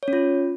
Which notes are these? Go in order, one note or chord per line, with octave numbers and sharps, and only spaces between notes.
C#5
C#4
F4